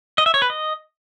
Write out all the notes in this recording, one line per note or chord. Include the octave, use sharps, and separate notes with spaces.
D#5
E5
C#5
B4
D#5